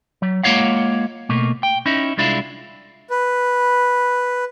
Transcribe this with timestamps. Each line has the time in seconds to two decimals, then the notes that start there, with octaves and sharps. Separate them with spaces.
0.22 F#3
0.43 G#3 A#3 F4 C#5 F5 F#5
1.29 B2 A3 A#3
1.63 G5
1.86 C#4 D#4 E4
2.17 C2 G#3 D4 E4 F4
3.10 B4